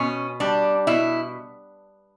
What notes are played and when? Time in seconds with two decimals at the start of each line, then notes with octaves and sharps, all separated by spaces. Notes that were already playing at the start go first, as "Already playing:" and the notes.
Already playing: B2 C#4
0.40 G3 D4
0.87 B2 E4